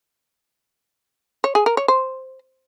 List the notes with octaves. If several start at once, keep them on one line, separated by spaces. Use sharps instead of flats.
C#5
G#4
A#4
C#5
C5